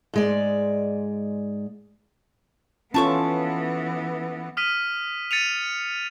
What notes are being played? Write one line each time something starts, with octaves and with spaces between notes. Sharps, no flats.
G#2 G#3 D5
E3 B3 C#4 F4 A4 A5 C#6 D6
D#6 F6 B6 D#7
A6 C#7 D#7 F7